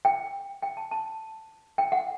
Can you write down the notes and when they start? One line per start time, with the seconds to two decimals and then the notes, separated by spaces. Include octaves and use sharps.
0.05 G5
0.62 G5
0.77 A5
0.91 A5
1.78 G5
1.92 F#5